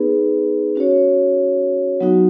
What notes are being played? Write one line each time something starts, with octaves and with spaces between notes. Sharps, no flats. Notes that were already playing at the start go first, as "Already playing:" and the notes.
Already playing: B3 D#4 G#4 B4
C#4 F#4 C#5
F#3 B3 D#4 F#4